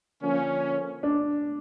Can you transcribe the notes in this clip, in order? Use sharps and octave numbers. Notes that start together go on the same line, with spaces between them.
D3 F3 A#3 C#4
D4